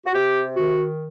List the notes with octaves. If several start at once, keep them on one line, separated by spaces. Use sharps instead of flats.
F#4
C3 G4
D#3 F#4